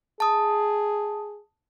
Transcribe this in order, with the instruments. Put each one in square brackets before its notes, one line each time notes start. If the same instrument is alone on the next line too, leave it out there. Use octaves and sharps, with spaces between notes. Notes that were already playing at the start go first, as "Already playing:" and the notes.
[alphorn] G#4 [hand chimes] A5 D#6